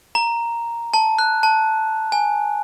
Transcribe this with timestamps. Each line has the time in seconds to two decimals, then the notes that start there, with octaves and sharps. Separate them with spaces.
0.15 A#5
0.94 A5
1.18 F#6
1.43 A5
2.12 G#5